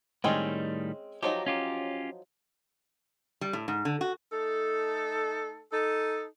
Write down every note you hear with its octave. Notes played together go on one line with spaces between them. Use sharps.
A2 D#3 G3 G#3 C4 C#4
F3 F#3 D#4 G4
C#4 F4 G4
G3
A2
G#2
D3
F#4
A3 D#4 A4
D#4 A4